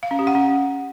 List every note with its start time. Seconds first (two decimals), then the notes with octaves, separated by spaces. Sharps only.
0.03 F5
0.11 C#4
0.19 G4
0.27 F#5
0.35 C#4